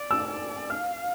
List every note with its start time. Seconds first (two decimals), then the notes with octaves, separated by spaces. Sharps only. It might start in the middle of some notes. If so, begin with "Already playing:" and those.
Already playing: D5
0.11 E6
0.31 D5
0.70 F5 F6